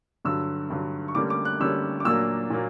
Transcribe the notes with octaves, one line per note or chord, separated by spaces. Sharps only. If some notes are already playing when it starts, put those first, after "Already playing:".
G2 D3 F#3 E6
G2 D3 F#3
C#6
D3 G3 A#3 C#4 D6
D6
F#6
D3 G3 A#3 C#4 E6
D6
A#2 F#3 A#3 D4 E6
A#2 F#3 A#3